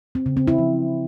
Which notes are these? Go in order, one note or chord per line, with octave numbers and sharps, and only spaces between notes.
C4
C#3
C4
E4
F3